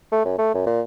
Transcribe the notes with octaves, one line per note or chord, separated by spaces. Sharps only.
A3
F#2
A3
F#2
A#2